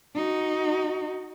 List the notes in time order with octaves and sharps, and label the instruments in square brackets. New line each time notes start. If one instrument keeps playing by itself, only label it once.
[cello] D#4 F#4